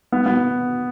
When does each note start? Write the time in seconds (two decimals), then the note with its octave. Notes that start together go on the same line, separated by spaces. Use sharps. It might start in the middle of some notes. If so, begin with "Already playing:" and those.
0.12 B3
0.26 B3